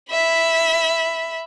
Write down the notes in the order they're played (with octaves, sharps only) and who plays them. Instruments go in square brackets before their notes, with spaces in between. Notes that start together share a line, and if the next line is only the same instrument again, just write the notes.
[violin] E5 B5